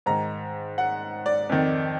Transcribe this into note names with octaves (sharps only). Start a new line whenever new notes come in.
G#2 D#3 A#5
F#5
D5
F2 D#3